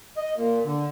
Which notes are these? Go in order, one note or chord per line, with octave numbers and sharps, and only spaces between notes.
D#5
A#2
D3